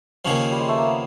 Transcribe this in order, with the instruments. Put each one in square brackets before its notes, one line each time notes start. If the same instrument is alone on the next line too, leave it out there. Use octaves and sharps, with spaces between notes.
[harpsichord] D#2 C#3 F3 [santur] C#4
[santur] G3
G#3
A3
A#3
B3